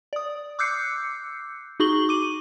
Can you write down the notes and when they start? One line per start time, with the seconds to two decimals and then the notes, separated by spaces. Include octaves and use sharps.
0.13 D5 D#6
0.59 D6 E6 F#6 G6 C7 C#7
1.80 D#4 F#4 G#4 C#6 F#7 G7
2.09 D6 D#7